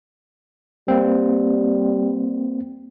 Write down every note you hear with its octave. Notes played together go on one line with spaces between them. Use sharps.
G3 A#3 C4